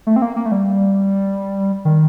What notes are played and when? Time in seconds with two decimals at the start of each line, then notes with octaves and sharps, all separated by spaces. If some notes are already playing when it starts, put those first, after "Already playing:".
0.07 A3
0.16 C4
0.22 A#3
0.36 A#3
0.46 A3
0.52 G3
1.85 D#3